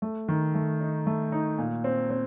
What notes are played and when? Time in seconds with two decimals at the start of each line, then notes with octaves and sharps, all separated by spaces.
0.02 A3
0.28 D#3
0.55 A3
0.81 D#4
1.07 A3
1.32 D#4
1.58 A#2
1.84 C4
2.10 C4